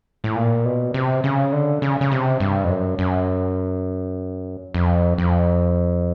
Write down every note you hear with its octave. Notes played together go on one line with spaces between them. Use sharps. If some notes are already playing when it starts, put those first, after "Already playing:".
A2
A#2
B2
C3
C#3
D3
C#3
C#3
C3
G2
F2
F#2
F#2
F2
F2